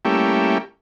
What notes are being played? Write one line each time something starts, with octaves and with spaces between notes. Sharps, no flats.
G3 A3 A#3 C#4 E4 G4